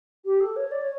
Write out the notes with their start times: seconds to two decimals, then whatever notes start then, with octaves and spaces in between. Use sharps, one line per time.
0.25 G4
0.40 A4
0.56 C#5
0.71 D5
0.81 C#5